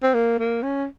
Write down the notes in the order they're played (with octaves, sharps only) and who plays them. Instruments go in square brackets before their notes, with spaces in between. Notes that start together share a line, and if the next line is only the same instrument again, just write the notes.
[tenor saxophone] C4
A#3
A#3
C#4